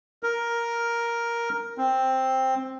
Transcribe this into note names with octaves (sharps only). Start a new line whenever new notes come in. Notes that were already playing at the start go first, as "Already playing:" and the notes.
A#4
C4